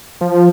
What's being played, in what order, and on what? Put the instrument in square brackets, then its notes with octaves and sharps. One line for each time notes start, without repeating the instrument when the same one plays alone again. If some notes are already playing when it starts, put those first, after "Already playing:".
[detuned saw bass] F3